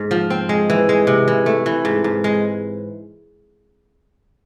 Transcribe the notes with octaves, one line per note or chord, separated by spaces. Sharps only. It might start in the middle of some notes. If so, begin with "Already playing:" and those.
Already playing: G#2
F3
C4
G#3
E3
G#3
C3
E3
A3
E3
G#2
G#2
G#3